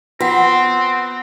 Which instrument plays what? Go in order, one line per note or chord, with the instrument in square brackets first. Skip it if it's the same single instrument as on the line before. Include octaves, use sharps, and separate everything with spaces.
[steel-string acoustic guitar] B3 [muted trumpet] C4 [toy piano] F4 F#5 [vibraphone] C6